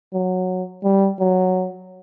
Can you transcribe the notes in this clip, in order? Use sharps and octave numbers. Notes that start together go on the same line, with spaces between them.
F#3
G3
F#3